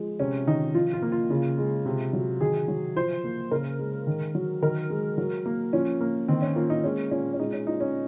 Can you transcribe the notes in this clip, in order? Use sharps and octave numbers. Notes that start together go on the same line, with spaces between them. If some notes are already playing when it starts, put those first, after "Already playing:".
Already playing: F3 G#3
C3 C#4
D#3 D#4
F3 F4
F4
A#3
F4
C#3
G#3
C3
F#3
D#3 G#4
F#3
F3 C5
A#3
C#3 A#4
G#3
D#3
F#3
D#3 A#4
G#3
F#3
A#3
F3 C#4
A#3
D#3 C4
C#4
A#3 F4
D#4
G#3 C#4
A#2 C#4
C#4
G#3 D#4
C#4
A#2 D#4
C#4